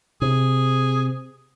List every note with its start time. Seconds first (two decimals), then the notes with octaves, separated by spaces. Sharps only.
0.21 C3 G#4